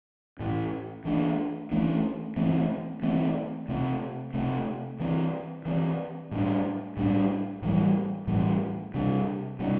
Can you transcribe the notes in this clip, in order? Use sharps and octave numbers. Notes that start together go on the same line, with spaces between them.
A2 E3 A3
E3 A3 D4
E3 A3 D4
E3 A3 C4
E3 A3 C4
C3 A3 C4
C3 A3 C4
E3 C4
E3 C4
A2 G3 D4
A2 G3 D4
A2 E3 G3
A2 E3 G3
C3 G3 D4
C3 G3 D4